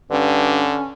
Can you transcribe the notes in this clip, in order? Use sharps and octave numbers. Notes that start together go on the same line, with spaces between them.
G2 D3 C#4